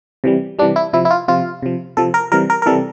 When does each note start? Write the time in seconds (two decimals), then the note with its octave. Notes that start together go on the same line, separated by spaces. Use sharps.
0.24 C3 E3 G3
0.59 C3 E3 G3 D4
0.76 E4
0.93 C3 F3 E4
1.05 E4
1.10 F4
1.28 C3 F3 F4
1.63 C3 F3
1.97 C3 F3 A4
2.14 A#4
2.32 C3 E3 G3 A#4
2.50 A#4
2.62 A#4
2.66 C3 E3 G3 A4